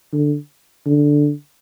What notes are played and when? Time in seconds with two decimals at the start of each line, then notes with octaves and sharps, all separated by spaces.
0.13 D3
0.86 D3